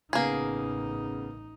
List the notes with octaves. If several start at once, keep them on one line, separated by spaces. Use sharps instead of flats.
A1 C#3 A#3 B3 D#4 G#4